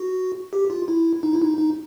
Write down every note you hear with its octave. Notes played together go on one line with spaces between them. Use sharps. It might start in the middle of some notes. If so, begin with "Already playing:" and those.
Already playing: F#4
G4
F4
E4
D#4
E4
D#4
D#4